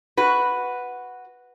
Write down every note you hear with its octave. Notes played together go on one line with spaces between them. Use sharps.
F#4 B4